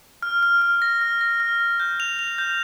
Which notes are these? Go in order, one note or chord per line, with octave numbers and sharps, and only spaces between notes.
F6
F6
F6
A#6
F6
A#6
F6
F6
G6
F7
F7
G6